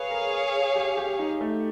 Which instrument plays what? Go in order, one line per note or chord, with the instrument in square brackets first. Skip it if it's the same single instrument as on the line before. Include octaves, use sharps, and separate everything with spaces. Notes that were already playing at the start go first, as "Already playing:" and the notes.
Already playing: [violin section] G#4 C#5 F5 [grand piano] B4
[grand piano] A#4
G4
G4
D#4
A3